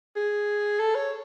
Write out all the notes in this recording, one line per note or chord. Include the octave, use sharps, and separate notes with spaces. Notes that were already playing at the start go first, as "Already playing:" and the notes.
G#4
A4
C#5